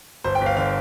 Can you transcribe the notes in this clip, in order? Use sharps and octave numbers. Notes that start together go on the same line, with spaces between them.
G1 C5
G5
G1
F5
D3 F5